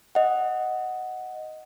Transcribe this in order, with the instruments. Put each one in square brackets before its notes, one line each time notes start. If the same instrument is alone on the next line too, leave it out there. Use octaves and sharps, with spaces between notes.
[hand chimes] D#5 F#5